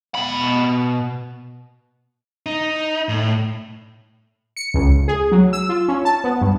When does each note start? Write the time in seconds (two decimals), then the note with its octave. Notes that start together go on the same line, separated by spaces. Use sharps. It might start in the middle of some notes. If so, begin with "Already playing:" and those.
0.15 B2 B5
2.46 D#4
3.09 A2
4.57 C#7
4.74 C#2
5.08 G#4
5.32 F#3
5.53 E6
5.69 F4
5.88 C#4
6.05 A5
6.24 B3
6.41 G2